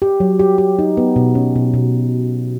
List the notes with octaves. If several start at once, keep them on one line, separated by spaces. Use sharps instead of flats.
G4
F#3
G4
G4
D#4
B3
B2
C#4
B2
B2